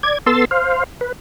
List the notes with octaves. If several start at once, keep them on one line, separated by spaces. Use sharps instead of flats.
D5 G#6
B3 A4 C6 E6 A6
C5 F5
B4